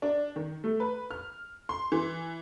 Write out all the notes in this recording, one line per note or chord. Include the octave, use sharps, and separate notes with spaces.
D4
D#3
A3
B4
F6
C6
E3